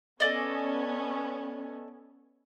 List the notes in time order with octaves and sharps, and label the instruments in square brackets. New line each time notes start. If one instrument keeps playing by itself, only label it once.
[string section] B3 C#4 [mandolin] A4 D5 D#5